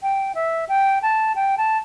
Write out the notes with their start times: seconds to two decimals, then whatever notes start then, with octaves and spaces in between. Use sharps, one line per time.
0.03 G5
0.35 E5
0.69 G5
1.02 A5
1.35 G5
1.58 A5